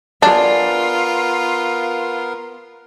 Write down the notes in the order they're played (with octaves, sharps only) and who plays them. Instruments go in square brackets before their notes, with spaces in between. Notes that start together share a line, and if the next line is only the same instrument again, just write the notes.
[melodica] B3 A#4 [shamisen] D4 [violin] F4 [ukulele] G#4 D5